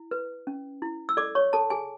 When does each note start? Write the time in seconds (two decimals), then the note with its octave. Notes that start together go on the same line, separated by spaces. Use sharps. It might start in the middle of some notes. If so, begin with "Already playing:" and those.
Already playing: E4
0.11 B4
0.47 C#4
0.82 E4
1.09 E6
1.17 A4 D5 D6
1.35 C#5 C#6
1.53 A4 A5
1.70 G#4 G#5